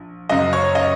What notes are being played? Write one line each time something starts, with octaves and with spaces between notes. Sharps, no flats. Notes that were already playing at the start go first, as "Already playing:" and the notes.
Already playing: A#1
F#1 F#2 C#3 D#5
C#5
D#5